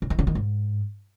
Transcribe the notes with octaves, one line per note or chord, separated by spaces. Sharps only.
C#3
D#3
C#3
D#3
G#2